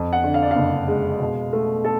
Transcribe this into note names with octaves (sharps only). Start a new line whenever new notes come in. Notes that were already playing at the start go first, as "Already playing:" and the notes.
Already playing: F2
F#5
D3
F5
D5
F#1 F5
G#3
B2
A3
A4